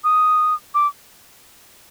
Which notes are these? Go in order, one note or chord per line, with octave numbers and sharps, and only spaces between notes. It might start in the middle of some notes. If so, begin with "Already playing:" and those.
D#6
D6